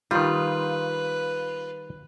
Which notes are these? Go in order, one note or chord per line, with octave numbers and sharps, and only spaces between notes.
D#3 G3 F4 B4